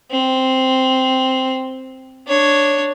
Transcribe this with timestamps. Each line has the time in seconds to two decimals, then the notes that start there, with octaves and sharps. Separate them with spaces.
0.11 C4
2.27 D4 C#5